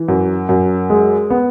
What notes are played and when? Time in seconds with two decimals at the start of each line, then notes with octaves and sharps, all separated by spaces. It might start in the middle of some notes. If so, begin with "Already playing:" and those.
Already playing: E3
0.08 F#2
0.49 F#2
0.90 G#3
1.30 B3